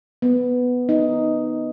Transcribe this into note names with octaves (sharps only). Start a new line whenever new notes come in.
B3
D#4